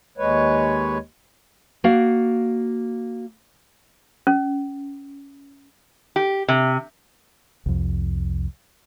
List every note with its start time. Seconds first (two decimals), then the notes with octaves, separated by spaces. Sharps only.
0.18 D#2 G#3 B4 C#5
1.84 A#3 F#4 D5 F5
4.27 C#4
6.16 G4
6.48 C3
7.66 C2 F2